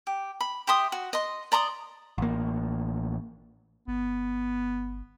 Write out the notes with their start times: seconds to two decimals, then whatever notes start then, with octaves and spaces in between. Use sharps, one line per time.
0.07 G4
0.40 B5
0.67 G4 E5 C6 D#6
0.92 F#4
1.13 D#5 C6
1.52 D5 A#5 C6 D#6
2.18 A1 A#3
3.88 G1 B3